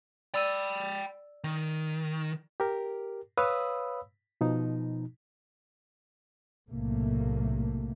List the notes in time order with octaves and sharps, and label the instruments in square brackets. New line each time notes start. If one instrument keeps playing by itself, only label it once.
[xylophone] D5 E6 D#7 [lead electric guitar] G5 B5
[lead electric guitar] D#3
[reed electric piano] G4 A#4
B4 C#5 F5 B5 D#6 E6
B2 F3 D#4
[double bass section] B1 A2 C3 A3 A#3